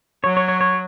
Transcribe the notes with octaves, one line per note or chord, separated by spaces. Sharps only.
F#3 C#5
C#5
C#5
C#5